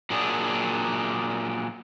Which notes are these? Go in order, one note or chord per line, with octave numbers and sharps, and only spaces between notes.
A#2 F#3 D4 G#4